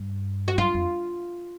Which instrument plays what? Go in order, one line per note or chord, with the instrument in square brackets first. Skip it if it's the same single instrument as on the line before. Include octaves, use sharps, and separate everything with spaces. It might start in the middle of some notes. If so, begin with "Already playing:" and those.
Already playing: [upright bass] G2
[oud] F#4
[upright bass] F#2 [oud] F4
[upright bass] F2